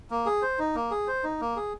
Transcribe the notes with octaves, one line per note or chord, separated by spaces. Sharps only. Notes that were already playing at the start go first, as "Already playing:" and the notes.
A#3
G#4
C5
D#4
A#3
G#4
C5
D#4
A#3
G#4